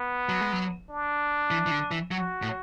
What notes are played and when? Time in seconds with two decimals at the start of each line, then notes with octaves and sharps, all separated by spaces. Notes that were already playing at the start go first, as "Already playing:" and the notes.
Already playing: B3
0.29 F#3
0.41 G#3
0.52 F#3
0.90 D4
1.51 E3
1.66 E3
1.71 D3
1.91 E3
2.11 F#3 F#4
2.42 A2